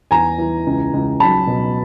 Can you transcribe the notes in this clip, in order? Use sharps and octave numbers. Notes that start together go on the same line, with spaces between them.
E2 G#5 A#5
E3
C#2
C#2
F#3 A5 B5
B2